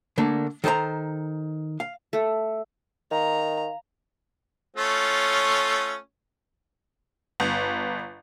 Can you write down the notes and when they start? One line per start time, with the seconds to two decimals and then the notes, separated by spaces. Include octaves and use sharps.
0.18 D3 A3 A#3 D4
0.64 D#3 A4 C5 D#5 A#5
1.80 F5
2.13 A3
3.11 D#3 F5 A#5
4.77 A3 C#4 F4
7.40 G1